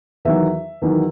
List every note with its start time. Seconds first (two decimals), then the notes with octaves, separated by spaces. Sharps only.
0.25 E2 D#3 F#3 E5
0.82 E2 D#3 F#3